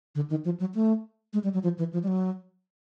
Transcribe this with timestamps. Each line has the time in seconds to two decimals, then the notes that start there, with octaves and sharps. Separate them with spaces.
0.15 D3
0.30 D#3
0.45 F3
0.60 F#3
0.75 A3
1.33 G#3
1.44 G3
1.54 F#3
1.63 F3
1.78 E3
1.93 F3
2.03 G3
2.08 F#3